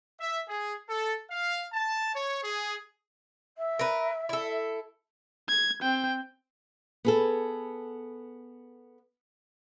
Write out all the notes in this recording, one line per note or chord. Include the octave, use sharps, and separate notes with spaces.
E5
G#4
A4
F5
A5
C#5
G#4
E5
A#4 B4
E4 A4
G#6
C4 G5
B3 G#4 A4